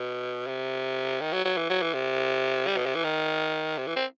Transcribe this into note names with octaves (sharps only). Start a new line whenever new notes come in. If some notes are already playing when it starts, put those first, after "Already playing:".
Already playing: B2
C3
D#3
F#3
F#3
E3
F#3
E3
C3
G3
B2
C3
E3
D#3
C3
E3
C4